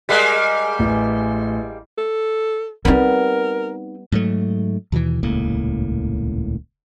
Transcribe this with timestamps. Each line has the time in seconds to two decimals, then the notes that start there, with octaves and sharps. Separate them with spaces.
0.09 G3 G#3 A#3 B6
0.79 A1
1.98 A4
2.85 G3 B3 C4 D#4 A#4
4.12 G#2 F#3 A3
4.92 D#2 B2 D3 E3
5.23 D#1 C#2 A2 A#3